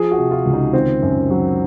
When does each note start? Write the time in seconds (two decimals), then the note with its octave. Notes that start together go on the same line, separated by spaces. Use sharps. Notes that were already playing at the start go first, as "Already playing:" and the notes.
Already playing: F3 G#4
0.11 F#4
0.18 C3
0.31 F4
0.45 C#2
0.53 D#4
0.73 D#3 C4
1.02 F#2
1.31 F#3